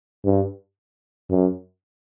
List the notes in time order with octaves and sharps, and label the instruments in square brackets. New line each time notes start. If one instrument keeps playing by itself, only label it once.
[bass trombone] G2
F#2